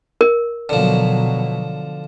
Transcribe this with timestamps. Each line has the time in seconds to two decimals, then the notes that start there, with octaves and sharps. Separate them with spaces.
0.21 A#4
0.69 B2 D3 F3 F#3